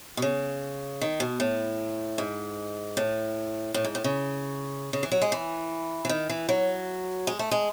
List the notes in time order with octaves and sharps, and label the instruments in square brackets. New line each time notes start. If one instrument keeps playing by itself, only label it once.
[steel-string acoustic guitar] B2
C#3
D#3
B2
A2
G#2
A2
A2
G#2
A2
C#3
C#3
E3
F#3
G#3
E3
E3
D#3
E3
F#3
G#3
A3
G#3